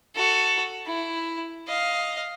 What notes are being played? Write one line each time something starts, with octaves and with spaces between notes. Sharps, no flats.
F#4 A4
E4
D#5 F5